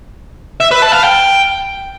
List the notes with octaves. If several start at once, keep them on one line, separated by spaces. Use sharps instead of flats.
E5
B4
A5
F5
G5